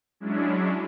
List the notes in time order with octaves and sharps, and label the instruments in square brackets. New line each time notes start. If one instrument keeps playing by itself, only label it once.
[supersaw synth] F#3 G#3 C#4 D4 E4